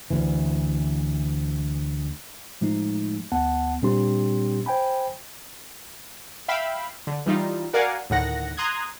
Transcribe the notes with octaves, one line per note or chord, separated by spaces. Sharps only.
D2 E3
A2 F3 G#3 A3 D#4
D2 B3 F#5 A5
A#2 G3 C4 D4 G4 C6
C5 G5 G#5 B5
E5 F5 G5 B5 E6
D3
E3 G3 D#4 F4
F#4 A#4 D5 F5 F#5 G#5
D2 A2 D#3 F#5 A#6
A#5 C6 D#6 F#6 G#6